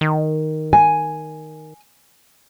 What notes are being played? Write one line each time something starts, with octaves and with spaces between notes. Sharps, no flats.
D#3
G#5